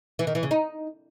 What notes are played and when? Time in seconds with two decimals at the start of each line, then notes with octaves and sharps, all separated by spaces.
0.19 E3
0.27 D#3
0.35 E3
0.43 C#3
0.51 D#4